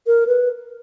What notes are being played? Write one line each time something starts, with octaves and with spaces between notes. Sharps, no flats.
A#4
B4